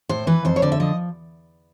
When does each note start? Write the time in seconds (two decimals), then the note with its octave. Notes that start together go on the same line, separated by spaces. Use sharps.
0.09 A2 C5
0.27 E3 B4
0.45 F2 C5
0.56 C#5
0.62 D3 D5
0.72 E5
0.80 F3 D#5